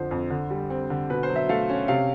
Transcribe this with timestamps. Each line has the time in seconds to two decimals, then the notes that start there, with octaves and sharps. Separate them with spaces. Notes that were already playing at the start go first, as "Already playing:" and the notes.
Already playing: F2 D3 F3 C5
0.11 F2
0.30 D3
0.50 G3
0.70 C4
0.90 D3
1.10 B2 B4
1.23 C5
1.29 F#3
1.36 E5
1.49 A3 F5
1.69 C#4
1.88 C3 F5